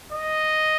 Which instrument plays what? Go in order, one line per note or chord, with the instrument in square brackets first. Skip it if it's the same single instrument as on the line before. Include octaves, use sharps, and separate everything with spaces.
[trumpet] D#5